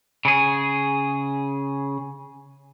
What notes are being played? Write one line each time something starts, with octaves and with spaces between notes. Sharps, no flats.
C#3 G#4